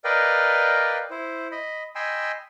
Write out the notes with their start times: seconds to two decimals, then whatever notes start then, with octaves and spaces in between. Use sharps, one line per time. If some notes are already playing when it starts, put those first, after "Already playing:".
0.04 A#4 B4 D5 D#5 F5 G5
1.11 E4 C5
1.51 D#5 B5
1.95 D#5 G5 G#5 B5 C6 E6